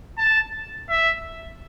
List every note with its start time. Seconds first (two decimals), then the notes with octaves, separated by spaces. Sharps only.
0.18 A5
0.89 E5